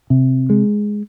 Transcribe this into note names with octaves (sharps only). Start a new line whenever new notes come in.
C3
G#3